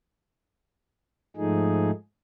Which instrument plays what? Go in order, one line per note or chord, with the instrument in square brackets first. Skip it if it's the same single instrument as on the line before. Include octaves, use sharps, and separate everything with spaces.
[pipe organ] G#2 F3 A3 D#4 G#4